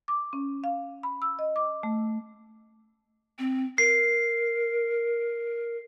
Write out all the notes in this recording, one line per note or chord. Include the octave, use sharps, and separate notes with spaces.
D6
C#4
F5
B5
E6
D#5
D6
A3
C4
A#4 C7